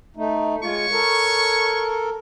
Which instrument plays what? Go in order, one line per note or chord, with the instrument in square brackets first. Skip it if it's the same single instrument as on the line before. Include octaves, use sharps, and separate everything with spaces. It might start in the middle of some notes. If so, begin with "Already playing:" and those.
[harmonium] A3 D#4
[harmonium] G#3 F4 [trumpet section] C#5 C#6
[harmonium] A4 A#4